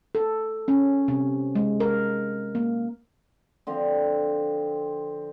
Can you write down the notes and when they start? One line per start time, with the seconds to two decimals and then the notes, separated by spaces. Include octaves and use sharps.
0.15 A4
0.68 C#4
1.08 C3
1.55 G#3
1.80 A#4
2.55 A#3
3.67 D3 F3 C4